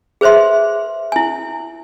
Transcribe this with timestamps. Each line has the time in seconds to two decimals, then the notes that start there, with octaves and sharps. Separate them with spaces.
0.21 G#4 B4 C5 E5 C6
1.12 E4 G#5